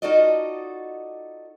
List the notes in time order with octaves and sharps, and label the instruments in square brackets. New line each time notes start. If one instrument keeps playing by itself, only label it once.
[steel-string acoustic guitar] D#4 F4 F#4 A4 D5 D#5